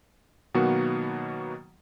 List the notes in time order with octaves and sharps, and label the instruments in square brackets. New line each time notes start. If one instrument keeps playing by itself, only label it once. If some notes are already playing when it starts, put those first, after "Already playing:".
[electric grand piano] B2 D#3 F#3 A#3 B3 F#4